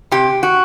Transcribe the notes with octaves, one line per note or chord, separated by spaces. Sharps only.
C3 G4
F#4